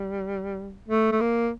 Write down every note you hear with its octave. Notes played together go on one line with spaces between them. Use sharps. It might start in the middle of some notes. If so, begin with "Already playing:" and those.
Already playing: G3
A3
A3
A#3